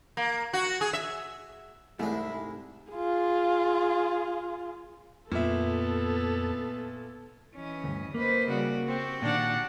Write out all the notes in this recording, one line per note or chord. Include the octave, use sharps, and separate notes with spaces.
A#3
F#4
G#4
E5
C2 G#2 G#3 A3 D4 E4
F4 G#4
F2 A#2 B3 A4 E5
E3 C#4 D#5
D2 G2
A#3 B4 C5 D#5
C#3 G3 F#4
C4 F#4 G4
A#2 D#3 D4 F#5